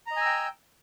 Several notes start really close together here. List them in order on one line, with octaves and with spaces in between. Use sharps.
A#5 D#5 G#5 E6 G5